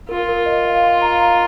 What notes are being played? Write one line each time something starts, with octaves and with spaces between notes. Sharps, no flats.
F4 A#4
A#4
D#5
F5
C6
A#5
A#5